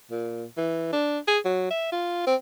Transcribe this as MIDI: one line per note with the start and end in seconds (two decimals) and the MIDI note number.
0.11 0.44 46
0.57 0.89 52
0.93 1.19 62
1.27 1.39 68
1.45 1.68 54
1.70 1.90 76
1.92 2.24 65
2.27 2.35 60